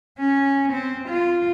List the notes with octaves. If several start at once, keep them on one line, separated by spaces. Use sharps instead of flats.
C#4
C4
F4